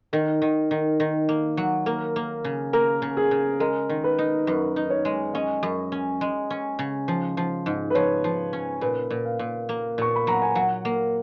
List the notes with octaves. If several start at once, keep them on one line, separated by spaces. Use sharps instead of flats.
D#3 A#4
D#3
D#3
D#3 A#4
A#3
F#3
A#3 A#4
A#3
C#3
A#3 A#4
C#3
G#4
C#3
G#3 A#4
D#3
B4
D#4
F#2 B4
D#4
C#5
G#3
C#4 D#5
F#2
C#4
G#3
C#4
C#3
F3
F3
G#2
B4
F3 C#5
F3
C#4
A#2 B4
A#2
F5
A#2
A#3
A#2 C#6
B5
F#3 A#5
G#5
F#3 F#5
A#3